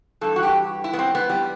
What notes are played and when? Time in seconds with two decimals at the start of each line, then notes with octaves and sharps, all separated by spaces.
0.21 G2 E3 A4
0.36 F#4
0.43 G4
0.84 E4
0.93 B3
0.99 C4
1.15 B3
1.29 G3